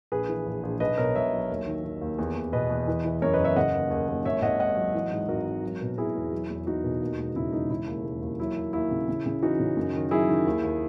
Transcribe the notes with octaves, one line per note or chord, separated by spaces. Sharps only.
A#1 G#4 B4
E3
A#1
A#1
B1 B4 D#5
B2 A#4 C#5
B1 C#5 E5
F#3
D#2
D#3
D#3
D#2
E2
E2
B2 B4 D#5
E2
E3
E3
F#2 A#4 C#5
B4 D#5
F#1
C#5 E5
C#3 D#5 F#5
D#2
D#2
D#2
G#1 C#5 E5
G#1 D#5 F#5
G#2 D#5 F#5
F#3
E3
G#2
G#1 F#4 A#4
G#1
F#3
B2
B2 E4 G#4
E2
F#3
E2
E2 D#4 F#4
B2
D#2
E1
C#3 E4
E1 D#4
C#3 E4
D#2
E1
D#2
F#3 E4
D#2
D#2 E4
C#3
C#3
C#3
E3 D#4 F#4
C#3
F#2
D#3
F#3 E4 G#4
D#3
D#2
D#2